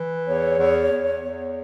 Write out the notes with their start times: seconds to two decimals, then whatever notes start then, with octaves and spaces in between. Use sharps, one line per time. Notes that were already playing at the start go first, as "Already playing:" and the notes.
Already playing: E3
0.26 E2 C#5
0.58 E2
0.91 E2
1.24 E2